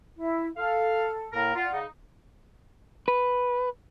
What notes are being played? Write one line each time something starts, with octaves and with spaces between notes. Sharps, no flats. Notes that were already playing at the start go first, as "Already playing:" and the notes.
E4
A4 F5
A2 A#3 A#4
F4 D5 F#5
C#3 D#4
B4